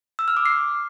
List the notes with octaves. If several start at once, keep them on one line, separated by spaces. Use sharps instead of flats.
E6
F6
D6
C7